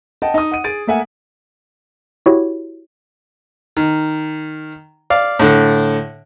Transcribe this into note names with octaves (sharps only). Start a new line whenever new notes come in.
D#5 F#5 G5 A5
D#4 D#5 D#6
F#5 D#7
G#4 A6 D7 D#7
A3 A#3 E5 F#5 G#5
E4 F#4 G4 C#5
D#3
D5 F5
A2 D3